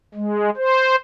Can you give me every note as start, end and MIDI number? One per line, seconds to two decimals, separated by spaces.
0.15 0.50 56
0.57 0.95 72